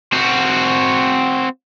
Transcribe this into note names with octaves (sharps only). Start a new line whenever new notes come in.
C4 F#4